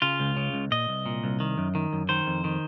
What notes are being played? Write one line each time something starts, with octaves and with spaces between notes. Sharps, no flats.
C#3 F4
C#2
C#3
C#2
A#2 D#5
C2
A#2
C2
D#3
F#2
D#3
F#2
D#3 C5
F2
D#3